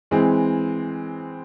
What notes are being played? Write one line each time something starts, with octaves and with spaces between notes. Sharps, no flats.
E3 G#3 C4